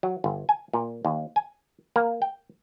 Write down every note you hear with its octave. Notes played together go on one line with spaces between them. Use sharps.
F#3
G1
G#5
A#2
D#2
G#5
A#3
G5